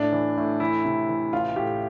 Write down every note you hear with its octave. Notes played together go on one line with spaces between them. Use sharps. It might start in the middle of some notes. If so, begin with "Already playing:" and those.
Already playing: A2 D4
E3
A2
E3 E4
C3
E3
A1 F4
A2 G4